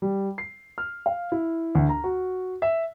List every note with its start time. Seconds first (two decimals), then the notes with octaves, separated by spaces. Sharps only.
0.02 G3
0.38 C7
0.78 F6
1.06 F5
1.32 E4
1.75 D2
1.89 A#5
2.04 F#4
2.62 E5